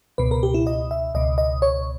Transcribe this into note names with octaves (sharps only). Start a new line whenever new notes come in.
C#2 B2 B4
A#4
G4
E4
D#5
E5
C#2 B2 D#5
D#5
C#5